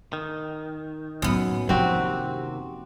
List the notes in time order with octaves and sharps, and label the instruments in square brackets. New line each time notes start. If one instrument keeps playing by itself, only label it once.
[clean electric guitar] D#3
[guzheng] F#2 B3 [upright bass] A2 F#3
[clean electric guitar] D#2 C3 [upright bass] F3 E4 [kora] C4 F#4